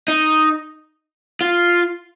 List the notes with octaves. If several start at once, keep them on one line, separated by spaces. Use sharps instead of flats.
D#4
F4